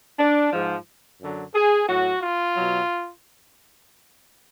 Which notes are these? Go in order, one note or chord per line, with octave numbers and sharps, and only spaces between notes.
D4
G#2 F3
F#2 D3 F#3
G#4
A2 F#3 F#4
F4
B2 F#3